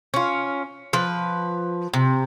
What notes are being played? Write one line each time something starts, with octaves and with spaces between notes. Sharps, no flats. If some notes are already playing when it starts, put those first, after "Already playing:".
C#4 F4
F3 B4
C3